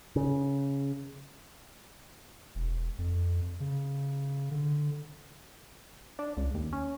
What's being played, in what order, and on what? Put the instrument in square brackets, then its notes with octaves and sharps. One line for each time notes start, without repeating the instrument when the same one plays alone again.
[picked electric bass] C#3
[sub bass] E1
F2
C#3
D3
[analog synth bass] D4
C#2
D#2
C#4